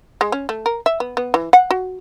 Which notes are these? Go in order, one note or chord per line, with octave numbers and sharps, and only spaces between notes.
G#3
C#4
A3
A#4
E5
B3
B3
E3
F#5
F#4